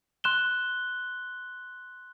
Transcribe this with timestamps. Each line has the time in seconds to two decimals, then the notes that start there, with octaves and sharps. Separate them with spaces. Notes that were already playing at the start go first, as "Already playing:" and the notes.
0.24 C6 F#6 E7 G7